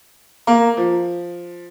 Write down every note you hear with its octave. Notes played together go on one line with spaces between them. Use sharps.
A#3
F3